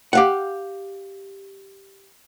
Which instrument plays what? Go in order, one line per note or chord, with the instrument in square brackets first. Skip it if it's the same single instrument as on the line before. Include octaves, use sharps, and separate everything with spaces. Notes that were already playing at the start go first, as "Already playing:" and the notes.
[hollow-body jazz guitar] G4 F5 F#5